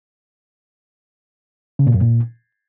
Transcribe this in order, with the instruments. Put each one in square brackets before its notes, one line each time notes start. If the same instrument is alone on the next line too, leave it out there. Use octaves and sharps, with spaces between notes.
[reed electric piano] C#3
A#2
F#2
A#2